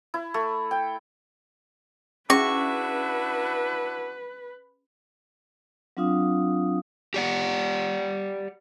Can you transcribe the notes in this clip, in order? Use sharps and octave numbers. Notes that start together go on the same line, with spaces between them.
E4
A3
G5
C#4 D4 E4 F#4 G#4 B4 E5 C#6
F#3 C4 D4 F4 F5 D#6
G4 D5 F#5